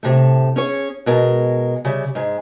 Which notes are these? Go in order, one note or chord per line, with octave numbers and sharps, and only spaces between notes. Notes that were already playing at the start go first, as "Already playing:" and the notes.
A2 C3 A3
C#4 G#4 C#5
B2 G#3 A#4
C#3 G3 E5
G#2 G#3